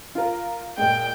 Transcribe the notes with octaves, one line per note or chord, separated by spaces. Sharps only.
F4 A#4
A#2 G#3 G5